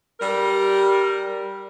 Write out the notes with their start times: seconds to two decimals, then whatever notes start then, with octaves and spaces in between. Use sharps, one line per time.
0.20 G3 A#4